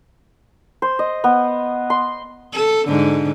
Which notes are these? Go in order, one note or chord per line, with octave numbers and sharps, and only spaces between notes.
C5
D#5
B3
C6
A4
G#2 D3